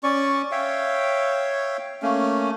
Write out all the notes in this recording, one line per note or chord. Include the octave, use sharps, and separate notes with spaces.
C#4 D5 C#6
C#5 E5 F5 G5
A3 A#3 C#4